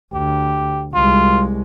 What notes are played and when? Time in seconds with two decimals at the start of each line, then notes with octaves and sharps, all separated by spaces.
0.13 D2 G4
0.94 C2 G#3 F4